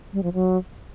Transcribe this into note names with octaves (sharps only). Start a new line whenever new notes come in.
G3
F3
F#3